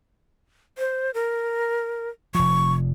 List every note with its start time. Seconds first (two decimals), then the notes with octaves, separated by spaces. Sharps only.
0.78 C5
1.14 A#4
2.35 F1 F3 C#6